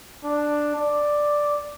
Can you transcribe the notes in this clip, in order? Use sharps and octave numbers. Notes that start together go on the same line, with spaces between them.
D4
D5